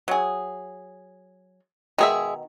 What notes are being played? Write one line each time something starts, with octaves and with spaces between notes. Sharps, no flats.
F#3 G#4
B2 D#3 G#3 G#4 E5